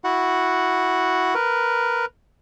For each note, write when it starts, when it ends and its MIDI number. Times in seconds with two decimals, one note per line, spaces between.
0.04 1.34 64
0.04 1.34 66
0.04 1.34 78
1.35 2.05 70
1.35 2.05 71